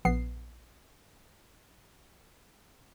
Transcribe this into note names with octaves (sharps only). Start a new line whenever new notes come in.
A#1 B3 C7